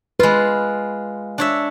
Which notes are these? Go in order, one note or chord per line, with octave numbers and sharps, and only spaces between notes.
G#3 F4 B4
D4 C#5 E5